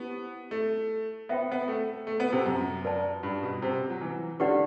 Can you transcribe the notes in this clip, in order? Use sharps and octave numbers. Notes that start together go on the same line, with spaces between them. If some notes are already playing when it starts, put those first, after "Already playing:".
Already playing: B3 E4 G4 C5 F#5
A3
B3 C5 E5 G5 B5
B3
A3
A3
B3
C3
F#2
B4 D5 A5
G2
B2
C3
F#3
E3
D3 E4 G4 B4 D5 F#5